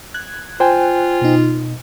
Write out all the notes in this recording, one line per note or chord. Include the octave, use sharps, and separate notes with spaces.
F#6 G#6
F4 C5 G5 G#5
B2 D#4